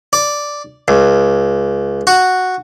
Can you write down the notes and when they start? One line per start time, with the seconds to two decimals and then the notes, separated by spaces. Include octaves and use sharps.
0.13 D5
0.88 C#2
2.07 F#4